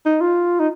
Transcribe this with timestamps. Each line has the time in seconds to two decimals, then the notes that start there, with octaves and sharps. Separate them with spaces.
0.06 D#4
0.21 F4
0.60 D#4